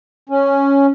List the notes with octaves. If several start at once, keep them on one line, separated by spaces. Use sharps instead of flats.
C#4